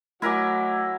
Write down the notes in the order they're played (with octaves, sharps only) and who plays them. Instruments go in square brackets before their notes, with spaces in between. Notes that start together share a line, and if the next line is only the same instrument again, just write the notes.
[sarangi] F#3 [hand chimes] A3 D6 [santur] E4 A#4 G#5